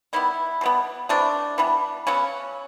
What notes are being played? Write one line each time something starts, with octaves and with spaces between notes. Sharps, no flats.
D#3 G3 B3 E4
B2 G3 B3
C3 E3 A3 D4
E3 G3 B3
C#3 F#3 B3 C#4